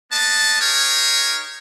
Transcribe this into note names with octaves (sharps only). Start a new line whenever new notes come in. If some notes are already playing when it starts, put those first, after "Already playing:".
A#3 B3 D#5 A5
D#4 G4 G#4 A#4 C#5